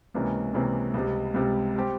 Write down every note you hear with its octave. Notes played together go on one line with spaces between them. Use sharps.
C#2 C3 E3 A#3 C#4
C#2 C3 E3 A#3 C#4
C#2 C3 G3
C#2 C3 G3
G3 C4 G4